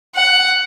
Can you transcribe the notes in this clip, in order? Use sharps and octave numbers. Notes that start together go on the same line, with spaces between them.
F#5